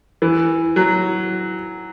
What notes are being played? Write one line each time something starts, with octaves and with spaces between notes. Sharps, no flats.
E3
F#3